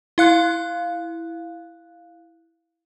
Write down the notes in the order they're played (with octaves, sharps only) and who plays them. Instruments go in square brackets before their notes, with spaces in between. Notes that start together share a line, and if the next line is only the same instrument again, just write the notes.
[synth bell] E4 F5 F#6